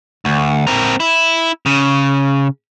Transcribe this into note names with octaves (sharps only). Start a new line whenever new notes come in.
D2
C4 A#4
E4
C#3